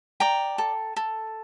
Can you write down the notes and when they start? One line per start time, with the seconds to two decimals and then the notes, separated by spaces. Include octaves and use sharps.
0.20 D5 G5 A#5
0.58 A4
0.96 A4